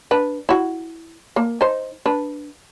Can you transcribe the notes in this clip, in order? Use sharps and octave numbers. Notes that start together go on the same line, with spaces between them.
D4 B4
E4 F#4
A#3
D#4 C5
D4 B4